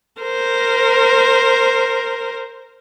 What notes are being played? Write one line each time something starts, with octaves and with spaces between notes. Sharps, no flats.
A#4 C5